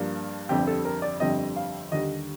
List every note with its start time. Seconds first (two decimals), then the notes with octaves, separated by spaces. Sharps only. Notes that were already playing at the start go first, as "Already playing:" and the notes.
Already playing: G2 F3 A#3 D4
0.49 G1 F2 D3 G3 C4 G4
0.67 A4
0.85 A#4
1.02 D5
1.20 G1 F2 D3 G3 C4 D#5
1.56 F5
1.92 D#2 D3 G3 D#5